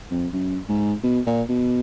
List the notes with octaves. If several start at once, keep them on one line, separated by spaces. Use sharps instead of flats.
F2
F#2
G#2
B2
A#2
B2